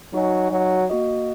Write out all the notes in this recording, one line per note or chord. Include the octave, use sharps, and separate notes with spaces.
F#3 D#4 F#4 D#5 G#5
F#3
A#3 F#4 D#5 F#5